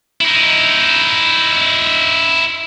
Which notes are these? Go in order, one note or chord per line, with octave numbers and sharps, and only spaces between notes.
D#4 E4